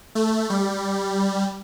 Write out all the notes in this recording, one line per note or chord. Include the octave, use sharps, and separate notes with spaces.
A3
G3